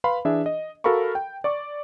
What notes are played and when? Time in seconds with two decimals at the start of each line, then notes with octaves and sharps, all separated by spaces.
0.04 B4 F5 B5 C6
0.25 E3 D4 G#4 E5
0.46 D#5
0.84 F#4 A4 A#4 F5 B5 C#6
1.15 G5
1.44 D5 C#6 D6